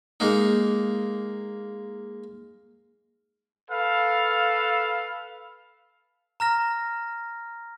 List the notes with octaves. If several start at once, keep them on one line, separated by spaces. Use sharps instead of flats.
G#3 A#3 D#4
A4 B4 F5
A#5 F6 A#6